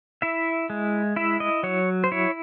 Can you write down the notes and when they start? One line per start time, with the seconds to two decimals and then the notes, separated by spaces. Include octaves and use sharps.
0.22 E4 E5
0.70 G#3
1.16 E4 E5
1.40 D#5
1.63 F#3 C#5
2.04 C5
2.12 E4 C#5